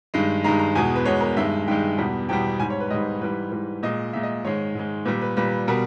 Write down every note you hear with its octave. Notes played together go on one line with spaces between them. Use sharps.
G2 D#3 G#3
G2 D#3 G#3 A#5
A#5
E2 B2 G#3 G#5
B4
E2 B2 G#3 C#5
A#4
G2 D#3 G#3 E5
G2 D#3 G#3 G5
E2 B2 G3
E2 B2 G3 G5
G#2 G3 G#5
C#5
B4
G#2 G3 D#5
G#2 E3 G3 B4
G#2 E3 G3
A#2 G#3 D#5
A#2 G#3 E5
D#5
G#2 D#3 G#3 C#5
G#2 D#3 G#3
A#2 G3 B4
B4
A#2 G3 B4
B2 G3 A#4